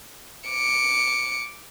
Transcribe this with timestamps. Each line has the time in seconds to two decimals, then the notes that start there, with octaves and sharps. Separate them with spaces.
0.50 D6 C#7